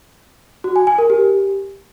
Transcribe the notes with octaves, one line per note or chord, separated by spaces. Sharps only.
F#4
G#5
G#5
A#4
G4